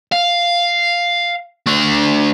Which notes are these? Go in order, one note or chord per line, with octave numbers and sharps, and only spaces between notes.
F5
A3 D4